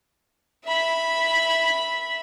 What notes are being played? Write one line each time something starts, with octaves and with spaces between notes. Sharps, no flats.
E5 B5